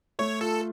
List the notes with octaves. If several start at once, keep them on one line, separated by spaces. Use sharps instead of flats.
A3 C#5
F4 A4